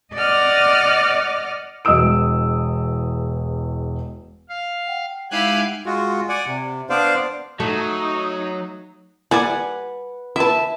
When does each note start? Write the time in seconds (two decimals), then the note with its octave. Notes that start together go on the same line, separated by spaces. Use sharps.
0.14 D5 D#5 F#5 D6 F6
1.85 E1 E2 D#5 D#6 E6 D7
4.49 F5
4.87 F#5 G5
5.31 G#3 D#4 E4 G4 F5 F#5 G#5 F#6
5.86 G#3 F4 F#4
6.29 D5 F#5 G#5
6.46 C3
6.90 B3 D4 C5 D5 F5
7.60 F#3 A3 D#4
9.31 G3 B4 D5 F#5 G#5
10.36 E4 B4 E5 A5